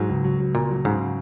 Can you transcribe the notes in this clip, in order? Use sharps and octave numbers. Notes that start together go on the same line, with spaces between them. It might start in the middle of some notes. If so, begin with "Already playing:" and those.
Already playing: G#2 F#3
C#2
F#3
F#3
A#2 F#3
F#3
G#2 C#3